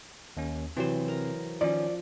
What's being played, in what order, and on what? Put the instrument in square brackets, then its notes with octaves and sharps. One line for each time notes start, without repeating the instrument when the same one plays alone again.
[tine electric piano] D#2 C#4
[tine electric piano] C3 C4 [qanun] E3 F#3 C5
[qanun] A#4 A#5
[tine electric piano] D#3 C#4 [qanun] F3 [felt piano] D5